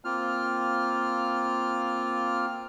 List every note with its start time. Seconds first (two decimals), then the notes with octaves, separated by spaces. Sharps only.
0.05 A#3 C4 F4 F6